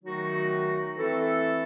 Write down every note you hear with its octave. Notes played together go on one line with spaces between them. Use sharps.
D#3 F#3 A3 D#4 F#4
E3 A3 C4 E4 A4